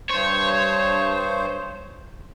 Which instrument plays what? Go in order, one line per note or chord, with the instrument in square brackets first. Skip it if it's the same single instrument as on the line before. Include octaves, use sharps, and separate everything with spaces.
[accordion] G2 C5 [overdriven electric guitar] C#5